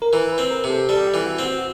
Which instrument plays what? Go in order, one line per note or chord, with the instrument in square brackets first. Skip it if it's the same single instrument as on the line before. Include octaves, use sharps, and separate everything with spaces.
[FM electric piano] A#4
[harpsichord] E3 [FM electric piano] B4
[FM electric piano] B4
[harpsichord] C4
[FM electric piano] A#4
[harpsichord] C3
[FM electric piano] A4
[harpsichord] G3 [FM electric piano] A4
[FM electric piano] G4
[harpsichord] E3
[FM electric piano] F#4
[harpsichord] C4
[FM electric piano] F#4